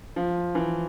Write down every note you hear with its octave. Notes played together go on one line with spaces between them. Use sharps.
F3
E3